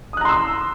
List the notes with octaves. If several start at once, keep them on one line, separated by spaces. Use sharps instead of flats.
A#5 C6 D#6 E6 F#6